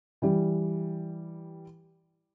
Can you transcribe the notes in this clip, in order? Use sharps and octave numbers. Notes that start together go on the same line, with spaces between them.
E3 G3